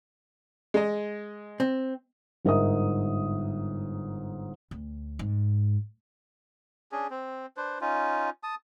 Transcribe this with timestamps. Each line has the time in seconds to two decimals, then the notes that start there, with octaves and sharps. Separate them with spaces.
0.74 G#3 D#5
1.60 C4
2.45 G1 G#2 A#4 D#5 E5 D#6
4.71 D2
5.19 G#2
6.92 C#4 D4 G#4
7.10 C4
7.57 D4 B4 C5
7.81 C#4 D#4 F4
8.43 A5 D#6